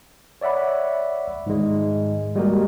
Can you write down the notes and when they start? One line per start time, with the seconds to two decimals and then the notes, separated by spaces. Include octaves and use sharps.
0.41 C#5 D5 E5 F#5 B5
1.46 G#2 D#3 G#3
2.35 G3 G#3 A#3 F#4 G4 A#4